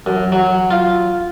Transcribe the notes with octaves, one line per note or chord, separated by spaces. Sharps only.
F#2
F#3
F4